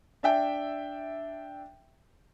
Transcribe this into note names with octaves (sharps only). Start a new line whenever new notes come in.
D4 E5 G5